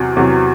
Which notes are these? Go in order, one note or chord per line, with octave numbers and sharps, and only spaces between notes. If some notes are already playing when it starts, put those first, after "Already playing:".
Already playing: E2 C3 F#3
E2 C3 F#3